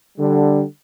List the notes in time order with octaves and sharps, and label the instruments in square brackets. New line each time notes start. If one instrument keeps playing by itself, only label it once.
[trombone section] D3 G3